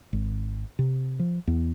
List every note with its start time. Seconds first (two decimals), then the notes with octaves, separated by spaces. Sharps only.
0.13 G#1
0.79 C3
1.19 F3
1.47 E2